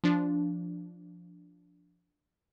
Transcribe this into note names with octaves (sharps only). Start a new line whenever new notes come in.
F3 D4